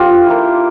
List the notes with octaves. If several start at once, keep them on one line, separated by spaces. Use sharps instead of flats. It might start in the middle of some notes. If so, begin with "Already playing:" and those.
Already playing: F3 D4 F4 G4 A4
A#3 E4